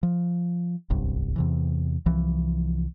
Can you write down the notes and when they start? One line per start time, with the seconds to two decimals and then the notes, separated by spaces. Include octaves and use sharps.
0.03 F3
0.90 D1 G1 C2
1.36 E2 C3 E3
2.06 C2 E3 F3